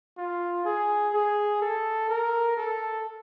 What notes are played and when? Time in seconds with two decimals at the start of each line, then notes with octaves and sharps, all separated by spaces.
0.18 F4
0.65 G#4
1.14 G#4
1.62 A4
2.10 A#4
2.57 A4